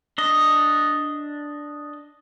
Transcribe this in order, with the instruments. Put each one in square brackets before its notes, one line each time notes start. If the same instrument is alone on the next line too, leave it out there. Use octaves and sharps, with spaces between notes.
[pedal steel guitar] D4 D#5